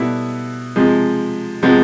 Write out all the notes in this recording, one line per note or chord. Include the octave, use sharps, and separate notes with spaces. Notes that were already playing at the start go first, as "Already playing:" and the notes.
Already playing: B2 G3 B3 E4 A4
C3 F3 G#3
C3 F3 G#3 B3